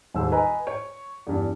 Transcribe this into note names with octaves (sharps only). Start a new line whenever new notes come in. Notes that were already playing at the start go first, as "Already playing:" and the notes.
D#1 G#2 E6
B4 D#5 G#5 A#5
C#5
E2 G2